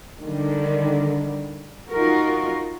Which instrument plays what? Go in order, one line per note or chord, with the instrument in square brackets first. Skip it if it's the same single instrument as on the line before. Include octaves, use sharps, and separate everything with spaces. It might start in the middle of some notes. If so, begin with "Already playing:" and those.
[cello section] D3 D#3 G3
D#4 F4 F#4 A#4